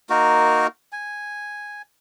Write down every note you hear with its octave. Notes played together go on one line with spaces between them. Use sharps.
A#3 D#4 F#4 A#4
G#5